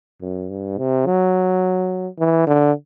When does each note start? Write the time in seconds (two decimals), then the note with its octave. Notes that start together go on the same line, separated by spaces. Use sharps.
0.21 F#2
0.49 G2
0.78 C3
1.06 F#3
2.19 E3
2.47 D3